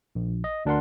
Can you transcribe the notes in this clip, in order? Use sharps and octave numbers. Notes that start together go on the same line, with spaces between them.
A#1
D#5
D2 D4 A#4 F#5 C6